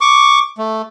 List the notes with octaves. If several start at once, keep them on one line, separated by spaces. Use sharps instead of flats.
C#6 D6
A3